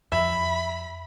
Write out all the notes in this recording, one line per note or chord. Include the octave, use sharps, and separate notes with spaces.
F2 F3 E5 B5